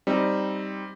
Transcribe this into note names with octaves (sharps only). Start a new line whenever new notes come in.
G3 C4 D#4